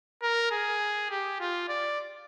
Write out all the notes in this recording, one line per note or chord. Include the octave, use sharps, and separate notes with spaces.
A#4
G#4
G4
F4
D5